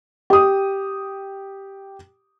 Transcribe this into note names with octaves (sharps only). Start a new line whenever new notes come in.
G4 D#6